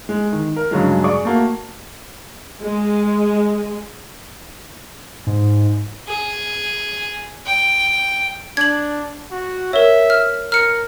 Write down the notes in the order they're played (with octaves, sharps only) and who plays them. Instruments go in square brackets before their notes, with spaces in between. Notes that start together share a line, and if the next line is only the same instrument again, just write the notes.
[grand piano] G#3
D#3
A#4
G2 C#3 F#3 G#3
G#4 D5 C#6 D6
A3 A#3 F#4
[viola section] G#3
[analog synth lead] G#2
[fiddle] G#4
G5
[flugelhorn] D4 [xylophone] G#6 F#7
[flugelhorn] F#4
[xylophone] A#4 C#5 [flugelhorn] E5
[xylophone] F6
[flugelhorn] A#4 [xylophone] F6 C#7